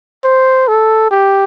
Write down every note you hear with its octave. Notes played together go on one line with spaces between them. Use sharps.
C5
A4
G4